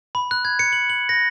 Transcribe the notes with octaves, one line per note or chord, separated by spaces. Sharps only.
B5
F#6
G#6
C#7
F#7
F#7
A#6